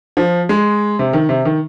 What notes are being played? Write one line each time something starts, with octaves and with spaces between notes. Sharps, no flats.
F3
G#3
C3
D#3
C3
D#3